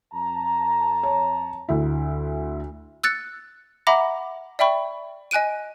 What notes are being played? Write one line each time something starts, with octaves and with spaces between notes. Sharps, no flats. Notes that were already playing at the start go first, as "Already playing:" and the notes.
F2 A5 A#5
C#5
D2 E4
E6 F#6 A6 C#7
E5 F#5 A#5 B5 D6 A#6
D5 E5 G5 B5 C#6
D#5 G#5 F#6 D7 D#7